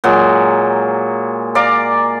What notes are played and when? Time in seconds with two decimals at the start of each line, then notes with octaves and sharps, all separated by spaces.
0.04 A#2 F#3 G#3
1.55 D5 F5 A#5